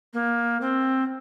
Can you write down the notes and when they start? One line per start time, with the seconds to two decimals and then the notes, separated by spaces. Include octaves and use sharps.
0.13 A#3
0.61 C4